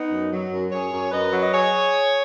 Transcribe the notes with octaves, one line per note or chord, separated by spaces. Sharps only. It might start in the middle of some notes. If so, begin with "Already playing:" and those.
Already playing: B3 D#4
F#2
F#3
F#2
F#2 G#4 C#5
F#2
F#2 B4 D#5
F#3
D#5
G#4 C#5